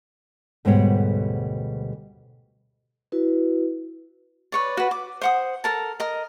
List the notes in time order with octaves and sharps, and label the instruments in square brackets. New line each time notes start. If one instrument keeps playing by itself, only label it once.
[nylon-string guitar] D2 G#2 B2 G3 C#5 F#5
[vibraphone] E4 F#4 B4
[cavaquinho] B4 C#5 D5
F#4 B4
D6
C5 F#5 D#6
A4 A#4 A5
A#4 D#5